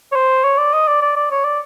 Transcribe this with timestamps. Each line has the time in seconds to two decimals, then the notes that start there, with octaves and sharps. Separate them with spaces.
0.12 C#5
0.16 C5
0.45 C#5
0.58 D5
0.73 D#5
0.88 D5
1.01 D5
1.16 D5
1.31 C#5
1.45 D5